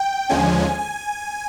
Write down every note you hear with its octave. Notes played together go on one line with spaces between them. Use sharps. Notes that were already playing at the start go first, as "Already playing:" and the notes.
Already playing: G5
D#2 D3 F3 G#3 C#4 G#5
G#5